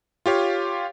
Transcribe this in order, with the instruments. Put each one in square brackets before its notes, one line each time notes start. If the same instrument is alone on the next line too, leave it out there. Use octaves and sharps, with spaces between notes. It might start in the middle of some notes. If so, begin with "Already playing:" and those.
[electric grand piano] F4 G4 C#5 F5